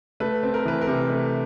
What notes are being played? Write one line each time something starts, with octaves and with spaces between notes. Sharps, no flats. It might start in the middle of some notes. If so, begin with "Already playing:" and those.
A3 B4
C4
A#4
E3 B4
A#4
C3
A3